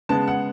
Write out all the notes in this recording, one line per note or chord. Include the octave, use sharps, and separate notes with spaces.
C#3 G#3 B3 A5
F#5